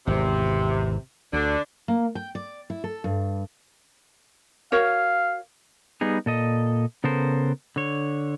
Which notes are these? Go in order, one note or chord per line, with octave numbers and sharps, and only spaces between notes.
G#1 E2 C3
D2 D3 D4
A#3
G5
D5
E4
A4
G2
F#4 A#4 C#5 F5
G3 B3 D#4 G#4
A#2 A4 D#5
C#3 B3 A4 A#4 C5
D3 C#5